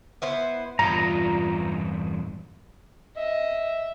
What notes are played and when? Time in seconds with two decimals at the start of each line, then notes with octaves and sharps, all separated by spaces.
0.22 B3 E4 C5
0.79 E2 G2 F4 B4 A#5
3.17 D#5 E5